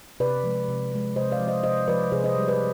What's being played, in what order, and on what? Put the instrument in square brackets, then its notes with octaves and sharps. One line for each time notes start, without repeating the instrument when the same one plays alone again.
[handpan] C3 B4 D5
F3 G#3
C3
F3 G#3
C3 C5 D#5
D5 F5
F3 G#3
C5 D#5
C3 C5 D#5
F3 G#3 B4 D5
C3 G#4 C5
C5 D#5
G3
B4 D5